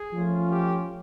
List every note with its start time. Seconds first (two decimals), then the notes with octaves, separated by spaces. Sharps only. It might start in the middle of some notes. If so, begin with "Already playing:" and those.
Already playing: G#4
0.12 F3 A3 C#4 F4
0.50 G4